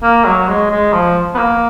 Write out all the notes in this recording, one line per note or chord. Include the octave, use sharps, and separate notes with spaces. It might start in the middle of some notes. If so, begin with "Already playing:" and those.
A#3
F#3
G#3
G#3
F3
B3
A#3